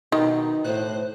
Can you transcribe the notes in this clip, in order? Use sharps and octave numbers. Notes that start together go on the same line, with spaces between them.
B2 D#3 D#4
A2 C5 F#6